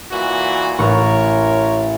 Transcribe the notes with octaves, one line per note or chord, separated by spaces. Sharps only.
A#2 E3 F#4
A1 A#4 C#5 C#6